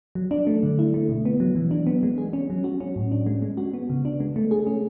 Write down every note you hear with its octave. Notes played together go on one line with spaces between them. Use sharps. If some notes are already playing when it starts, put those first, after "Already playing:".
F#3
D4
A3
D3
E4
A3
B2
B3
F#3
E3
D4
B3
G#3
G#4
C#4
F#3
F#4
C#4
A2
D4
G#3
G#3
F#4
B3
C#3
D4
G#3
A3
G#4
C#4